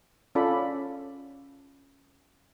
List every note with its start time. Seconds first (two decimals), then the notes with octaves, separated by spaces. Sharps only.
0.35 C#4 F4 A4 D5 B5